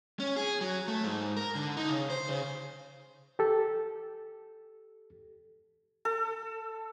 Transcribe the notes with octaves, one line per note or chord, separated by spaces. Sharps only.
C#4
G#4
F#3
A3
G#2
A#4
D3
D#4
C#3
C5
C#3
G4 A4
A4